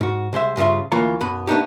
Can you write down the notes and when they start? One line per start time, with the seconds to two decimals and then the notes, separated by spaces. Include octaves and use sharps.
0.01 G#2 F#4
0.33 C2 G#3 C5 E5
0.57 G2 C#3 F4 E5 C6
0.92 D2 E3 A#3 F4 C#5 A#5
1.21 B1 F#2 B3 B5
1.47 A3 B3 D4 D#4 G4